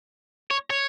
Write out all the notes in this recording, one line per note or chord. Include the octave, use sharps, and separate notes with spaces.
C#5
C#5